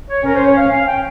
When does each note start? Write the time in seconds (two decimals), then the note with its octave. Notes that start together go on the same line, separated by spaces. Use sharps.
0.09 C#5
0.25 C#4 A#4
0.36 C5
0.46 C#5
0.56 F5
0.72 F5
0.88 G5